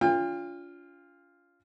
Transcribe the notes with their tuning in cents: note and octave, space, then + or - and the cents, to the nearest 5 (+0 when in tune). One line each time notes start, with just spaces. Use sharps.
D4 -45 F4 +0 G5 +40